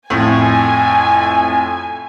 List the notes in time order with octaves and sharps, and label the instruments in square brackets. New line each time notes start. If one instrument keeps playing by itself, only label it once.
[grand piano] F2 A2 [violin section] G#5